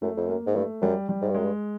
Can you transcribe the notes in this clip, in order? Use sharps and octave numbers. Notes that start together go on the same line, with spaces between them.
F#2 A3
F2
F#2 A#3
G#2
G2 A3
F#2 G3
G3
G#2
G2
F#2 G#3
G2